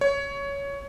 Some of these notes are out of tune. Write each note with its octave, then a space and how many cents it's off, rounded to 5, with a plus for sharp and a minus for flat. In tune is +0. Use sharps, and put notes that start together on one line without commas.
C#5 +15